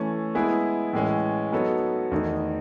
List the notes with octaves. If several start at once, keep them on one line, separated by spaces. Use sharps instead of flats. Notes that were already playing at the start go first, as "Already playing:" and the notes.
Already playing: E3 A3 C#4
G#3 B3 E4 G#4
A2 E3 G#3 C#4
F#3 B3 D#4 A4 C#5
E2 D#3 A3 D#4